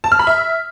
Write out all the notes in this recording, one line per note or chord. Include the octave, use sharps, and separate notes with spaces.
A5
F6
B5
E5